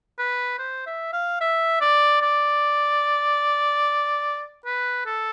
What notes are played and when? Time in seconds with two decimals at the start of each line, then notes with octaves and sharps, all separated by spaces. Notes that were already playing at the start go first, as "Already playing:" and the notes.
0.19 B4
0.59 C5
0.86 E5
1.13 F5
1.41 E5
1.81 D5
2.22 D5
4.66 B4
5.06 A4